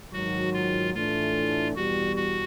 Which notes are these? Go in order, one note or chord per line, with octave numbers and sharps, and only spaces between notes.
G#2 D#3 F#3 F#4
F4
A2 E3 A3 D4 F4
E2 B2 G3 F#4
F#4